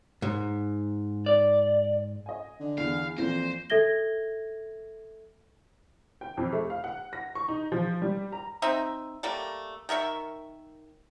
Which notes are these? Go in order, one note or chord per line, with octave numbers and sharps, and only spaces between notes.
G#2
D5
D#5 G#5
D3
E2 F5
F2 A#2 E3 C5 A#6
A4 E5 G#6 A#6 G7
G5
F2
A3
F5
F#5
A#6
C#6
D#4
F3
G3
A#5
C4 D#4 E5
G3 A3 A#3
D#3 A#4 E5 C#6